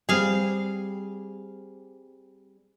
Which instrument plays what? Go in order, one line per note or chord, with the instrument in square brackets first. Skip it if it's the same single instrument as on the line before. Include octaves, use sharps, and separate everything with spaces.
[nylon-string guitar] G3 C4 [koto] G#4 F5